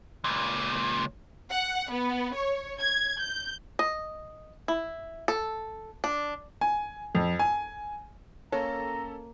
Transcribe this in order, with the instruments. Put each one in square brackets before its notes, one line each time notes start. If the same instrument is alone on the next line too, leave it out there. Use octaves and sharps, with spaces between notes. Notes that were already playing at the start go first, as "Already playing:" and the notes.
[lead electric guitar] C#2 A#2
[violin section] F#5
B3
C#5
G#6
G6
[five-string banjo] D#5
E4
A4
D4
[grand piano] G#5
F2
G#5
[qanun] A#3 [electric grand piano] C#4 A4 A5 [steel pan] C#5 [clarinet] A#5